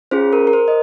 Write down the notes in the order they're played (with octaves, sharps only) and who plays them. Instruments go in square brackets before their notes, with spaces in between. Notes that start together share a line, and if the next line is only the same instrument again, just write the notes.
[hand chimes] C#4 F4 G#4 C5
A#4
A#4
C5
D#5